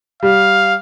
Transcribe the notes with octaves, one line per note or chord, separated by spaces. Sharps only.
G3 F5